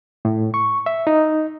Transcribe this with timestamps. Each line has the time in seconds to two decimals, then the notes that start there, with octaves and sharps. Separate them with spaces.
0.25 A2
0.54 C#6
0.86 E5
1.07 D#4